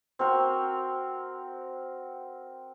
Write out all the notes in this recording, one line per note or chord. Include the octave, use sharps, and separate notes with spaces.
C4 F#4 A#4